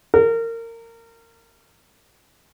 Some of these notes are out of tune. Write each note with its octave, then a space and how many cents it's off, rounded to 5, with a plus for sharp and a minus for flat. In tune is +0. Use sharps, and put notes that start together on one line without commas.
A#4 -25